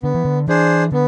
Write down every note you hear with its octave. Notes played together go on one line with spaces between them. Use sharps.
D3 B3
E3
D3
E3 D4 G#4 C5
D3 B3